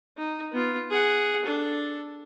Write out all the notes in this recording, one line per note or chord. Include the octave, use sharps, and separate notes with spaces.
D#4
B3 F4
G#4 F#5
D4 A4